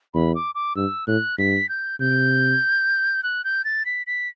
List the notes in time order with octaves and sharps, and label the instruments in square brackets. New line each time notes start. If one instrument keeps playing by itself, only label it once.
[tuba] E2 [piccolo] B5
[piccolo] D6
D6
[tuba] G2 [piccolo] E6
[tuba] A2 [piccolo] F#6
[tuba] G2 [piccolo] B6
[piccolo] G6
[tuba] C3 [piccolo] G6
[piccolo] F#6
G6
A6
B6
B6